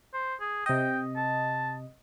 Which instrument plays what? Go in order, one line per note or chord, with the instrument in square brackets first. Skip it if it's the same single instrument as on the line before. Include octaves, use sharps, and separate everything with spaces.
[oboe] C5
G#4
[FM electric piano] C3 D#5 [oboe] G5
[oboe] A5